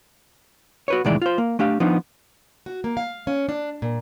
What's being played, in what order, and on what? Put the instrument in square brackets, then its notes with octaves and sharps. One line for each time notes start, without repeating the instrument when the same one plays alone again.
[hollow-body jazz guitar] F#4 B4 C#5
C2 A2 D#3 E3 G#3 D5
F4 C5
A#3
A3 D4 G4 F5
F3 B3 D4 D#4
[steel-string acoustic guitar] F#4
A#3
F5
C#4
D4
A#2